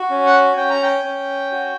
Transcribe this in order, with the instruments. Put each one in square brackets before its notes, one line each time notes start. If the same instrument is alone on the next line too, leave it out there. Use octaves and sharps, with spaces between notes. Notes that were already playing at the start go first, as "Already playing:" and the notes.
Already playing: [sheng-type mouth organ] F#4
C#4
F#5
C#4 G5
A#5
G5
C#4
F#4